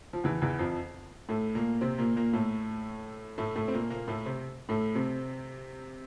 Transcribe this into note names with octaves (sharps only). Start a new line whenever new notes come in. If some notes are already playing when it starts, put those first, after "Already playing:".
F3
E2 E3
E2 E3
F2 F3
A2 A3
A#2 A#3
C3 C4
A#2 A#3
A#2 A#3
A2 A3
A2 A3
A2 A3
C4
A#2 A#3
A#2 A#3
A2 A3
C3 C4
A2 A3
C3 C4